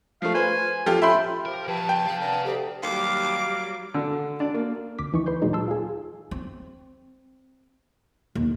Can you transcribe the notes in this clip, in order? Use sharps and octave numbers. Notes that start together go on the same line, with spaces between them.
F3 A3 F5
B4 C5 G#5
F3 F4 G4 A4
E5 G5 B5 C6
F3 G4 A#4
F3 G4 B4 F#5 A5
G5
G#4 F5
B3 D4 A5 A#5
D2 G4
D#2 F#3 G3 F5 D6
D3
D4
A#3
D2 D6 B6
D2 E3 D#4 C#6
B4 C6 G6
E2 A#2 F#3 G#3 D#4
A5 C6 E6
F4 G#4
C4
D#2